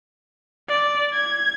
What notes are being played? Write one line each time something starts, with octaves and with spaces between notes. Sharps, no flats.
D5
G#6